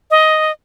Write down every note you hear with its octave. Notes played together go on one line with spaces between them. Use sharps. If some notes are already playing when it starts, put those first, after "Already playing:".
D#5